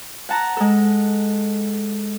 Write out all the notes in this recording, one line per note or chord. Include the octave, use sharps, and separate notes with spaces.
F#5 A5 A#5
G#3 A4